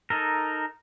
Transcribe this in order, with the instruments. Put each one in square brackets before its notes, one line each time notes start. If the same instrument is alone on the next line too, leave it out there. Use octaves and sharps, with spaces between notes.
[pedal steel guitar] D#4 A4 A#4